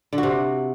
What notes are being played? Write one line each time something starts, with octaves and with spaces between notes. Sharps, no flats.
D3
F#4
C3